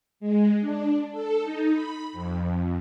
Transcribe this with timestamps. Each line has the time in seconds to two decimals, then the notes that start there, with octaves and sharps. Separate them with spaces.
0.20 G#3
0.60 D4
1.11 A4
1.43 D#4
1.73 B5
2.12 F2